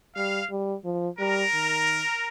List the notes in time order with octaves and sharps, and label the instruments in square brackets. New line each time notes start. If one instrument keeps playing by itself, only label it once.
[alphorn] G3 [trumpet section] F5
[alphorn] G3
F3
[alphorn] G3 [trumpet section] A#4
[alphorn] D#3